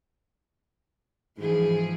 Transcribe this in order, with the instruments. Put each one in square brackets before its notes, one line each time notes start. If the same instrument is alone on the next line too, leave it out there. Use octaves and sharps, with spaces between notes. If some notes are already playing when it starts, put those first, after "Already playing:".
[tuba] G#2 [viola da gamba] E3 F3 G#4